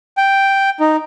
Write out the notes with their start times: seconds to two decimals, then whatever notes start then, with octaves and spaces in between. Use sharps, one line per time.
0.17 G5
0.80 D#4